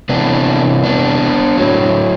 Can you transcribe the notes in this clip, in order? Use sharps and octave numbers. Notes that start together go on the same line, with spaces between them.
C3 E3 B3 D4
B3 D4
A2 F#3